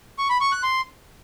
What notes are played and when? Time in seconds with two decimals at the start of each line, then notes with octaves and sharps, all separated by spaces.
0.18 C#6
0.30 B5
0.41 C#6
0.52 F#6
0.63 C6